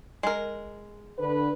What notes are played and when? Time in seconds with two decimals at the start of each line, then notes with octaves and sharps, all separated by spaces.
0.23 G#3 A#4
1.18 D3 B4